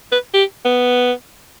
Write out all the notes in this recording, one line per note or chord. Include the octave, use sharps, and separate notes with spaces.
B4
G4
B3